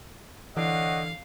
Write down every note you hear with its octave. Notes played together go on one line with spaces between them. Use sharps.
D3 E3 C#5 D#5 F5 F#5